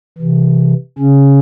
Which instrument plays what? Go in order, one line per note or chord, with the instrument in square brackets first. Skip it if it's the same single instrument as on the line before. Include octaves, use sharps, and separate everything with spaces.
[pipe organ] C3 E3
C#3 C#4